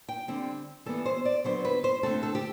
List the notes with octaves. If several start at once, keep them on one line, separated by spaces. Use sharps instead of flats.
G5
D3 G3 C4
E3 G3 B3 A4
C5
D5
D3 F#3 B3 C5
B4
C5
D3 A3 C4 A4
A4
G4